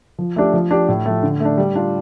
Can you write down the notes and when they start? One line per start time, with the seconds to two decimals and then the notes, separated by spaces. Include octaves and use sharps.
0.18 F3
0.36 A3 D4 G4
0.53 F3
0.71 D4 G4
0.88 A2
1.06 F3 A3
1.23 D3
1.40 A3 D4
1.58 G3
1.75 D4 F4